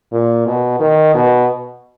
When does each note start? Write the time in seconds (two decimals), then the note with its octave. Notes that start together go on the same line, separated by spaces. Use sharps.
0.12 A#2
0.46 B2
0.80 D#3
1.15 B2